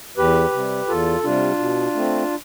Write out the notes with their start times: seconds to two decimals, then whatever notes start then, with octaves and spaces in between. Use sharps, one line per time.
0.17 E2 G4 B4
0.53 C3 G3
0.88 E2 F4 A4
1.23 C3 G3 D4 F4
1.59 B2
1.95 A3 C4